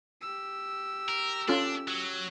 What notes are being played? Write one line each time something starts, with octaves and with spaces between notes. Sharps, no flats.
G4 E6
A#4
C#4 D4 F4 A4
F#3